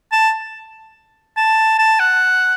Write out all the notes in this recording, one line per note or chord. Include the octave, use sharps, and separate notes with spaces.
A5
A5
A5
F#5